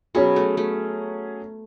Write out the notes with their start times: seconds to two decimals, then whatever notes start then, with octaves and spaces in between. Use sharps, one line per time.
0.15 B2 F#3 B3 C#4 G#4
0.36 A3
0.57 A3